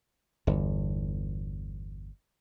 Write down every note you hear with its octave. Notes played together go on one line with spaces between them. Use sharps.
G1 E2